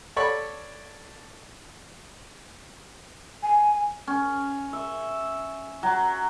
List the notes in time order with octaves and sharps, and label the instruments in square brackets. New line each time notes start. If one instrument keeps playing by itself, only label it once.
[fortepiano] A4 C#5 D5 B5 C#6
[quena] G#5
[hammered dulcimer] C#4
E5
F#3